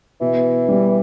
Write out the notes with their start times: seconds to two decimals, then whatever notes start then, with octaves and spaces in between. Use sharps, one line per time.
0.21 B2 E3
0.69 G3